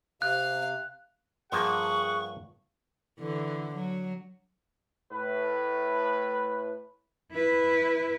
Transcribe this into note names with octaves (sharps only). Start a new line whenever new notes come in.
C3 F5 F#6
G2 F3 A#3 G#4 F#5 C#6
D3 E3
F#3
A2 B4
E4 B4